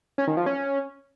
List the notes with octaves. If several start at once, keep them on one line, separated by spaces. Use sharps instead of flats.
C#4
D#3
F3
C#4